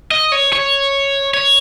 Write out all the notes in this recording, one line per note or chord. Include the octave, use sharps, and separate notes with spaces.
D#5
C#5
C#5
C#5